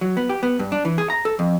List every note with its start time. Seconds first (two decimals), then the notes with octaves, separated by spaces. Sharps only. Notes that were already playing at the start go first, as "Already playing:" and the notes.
0.01 F#3
0.17 B3
0.29 G4
0.43 B3
0.59 G2
0.72 D4
0.85 E3
0.98 G#4
1.10 A#5
1.25 A4
1.39 F2